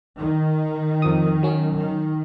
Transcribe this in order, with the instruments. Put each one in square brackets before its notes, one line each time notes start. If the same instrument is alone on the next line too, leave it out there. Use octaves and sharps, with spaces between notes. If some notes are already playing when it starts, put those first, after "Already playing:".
[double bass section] D#3
[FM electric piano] F2 F3 D#6
F#3 C#4
[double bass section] D#3